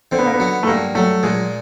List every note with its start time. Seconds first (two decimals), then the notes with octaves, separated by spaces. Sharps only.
0.12 D3 C4
0.19 B3
0.26 A#3
0.34 B3
0.40 F#3
0.63 A3
0.67 G2 A#3
0.95 F#3 A3
1.23 A#2 G#3